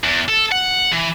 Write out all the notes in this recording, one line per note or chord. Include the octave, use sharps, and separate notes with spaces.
E2
A4
F#5
E3